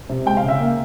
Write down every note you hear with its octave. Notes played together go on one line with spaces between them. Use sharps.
C3
G#3 G5
F5
C#3 E5
A#3